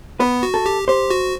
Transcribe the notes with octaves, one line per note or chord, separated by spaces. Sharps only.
B3 B4
F#4
A4
G4
G4 C5
F#4